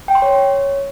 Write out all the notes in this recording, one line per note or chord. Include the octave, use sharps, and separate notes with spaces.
G5
C6
C#5